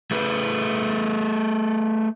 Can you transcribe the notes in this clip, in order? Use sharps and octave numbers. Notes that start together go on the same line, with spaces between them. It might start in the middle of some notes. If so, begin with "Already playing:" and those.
A3 G#4 B4